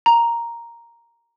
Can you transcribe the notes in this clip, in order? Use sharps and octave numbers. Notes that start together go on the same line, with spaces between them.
A#5